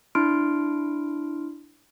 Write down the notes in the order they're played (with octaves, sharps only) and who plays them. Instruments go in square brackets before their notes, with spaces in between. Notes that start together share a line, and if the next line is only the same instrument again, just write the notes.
[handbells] D4 E4 C6 F6 D7